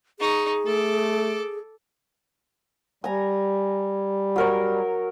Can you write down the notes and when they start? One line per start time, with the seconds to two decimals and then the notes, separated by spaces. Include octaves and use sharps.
0.20 D#4 G#4 C#6
0.66 A3 A4 D6
3.04 G3 G#5 A#5
4.36 F#3 A#4 C#5